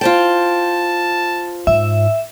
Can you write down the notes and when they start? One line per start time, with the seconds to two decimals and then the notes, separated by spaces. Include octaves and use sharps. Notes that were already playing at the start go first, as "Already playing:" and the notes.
0.01 F4 C5 G5 A5
1.67 G#2 E5